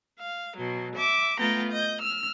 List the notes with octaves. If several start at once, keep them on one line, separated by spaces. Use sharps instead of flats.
F5
B2 F#3
E5 D6
A3 B3 F4 G5 A#5
D#5 G6
E6 F6